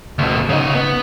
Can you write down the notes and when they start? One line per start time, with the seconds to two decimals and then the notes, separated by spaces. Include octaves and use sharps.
0.19 D2 B2
0.49 C#3 D#4
0.75 B3